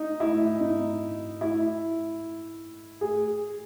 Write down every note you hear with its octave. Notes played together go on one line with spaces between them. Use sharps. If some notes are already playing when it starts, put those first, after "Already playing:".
Already playing: D#4
E4
D#4
E4
G#4